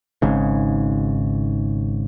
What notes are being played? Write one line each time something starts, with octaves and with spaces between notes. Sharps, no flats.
G#1 G#2 C#3